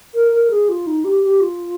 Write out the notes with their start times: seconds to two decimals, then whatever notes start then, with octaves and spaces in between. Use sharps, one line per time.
0.14 A#4
0.32 A#4
0.50 G#4
0.69 F4
0.87 D#4
1.05 G4
1.24 G4
1.41 F4